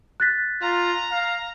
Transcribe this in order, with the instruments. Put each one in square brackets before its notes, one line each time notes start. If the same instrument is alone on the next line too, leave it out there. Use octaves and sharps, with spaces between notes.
[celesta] F#6 A6 B6
[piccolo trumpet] F4 [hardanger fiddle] A#5
[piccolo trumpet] F5